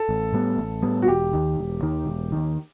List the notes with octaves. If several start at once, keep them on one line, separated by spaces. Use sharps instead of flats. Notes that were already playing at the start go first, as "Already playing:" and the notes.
Already playing: A4
A1
A2 G3 B3
A1
A2 G3 B3
F#4
E1 G4
D#2 D#3
E1
D#2 D#3
E1
D#2 D#3